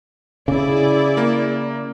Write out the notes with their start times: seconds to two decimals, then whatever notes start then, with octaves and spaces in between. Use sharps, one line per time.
0.48 C#3 E4 G#4 D5
1.17 A#3